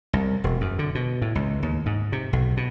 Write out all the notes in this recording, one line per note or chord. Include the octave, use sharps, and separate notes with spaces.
C2
E1
F#2
D3
B2
A2
C#2
D#2
G#2
C3
B1
B2